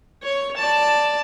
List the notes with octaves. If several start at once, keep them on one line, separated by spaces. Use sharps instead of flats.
C#5
D5 A5